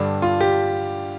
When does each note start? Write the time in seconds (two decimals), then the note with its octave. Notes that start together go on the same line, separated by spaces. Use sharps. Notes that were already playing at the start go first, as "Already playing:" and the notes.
Already playing: G2 D3 G3 D4
0.22 F4
0.41 G4